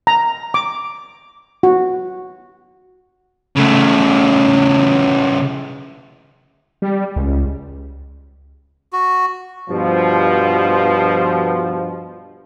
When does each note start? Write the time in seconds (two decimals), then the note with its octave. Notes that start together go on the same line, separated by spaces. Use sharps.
0.07 A#5
0.54 D6
1.63 F#4
3.56 C#3 A3
6.82 G3
7.16 C#2
8.93 F#4
9.69 G2 B2 F3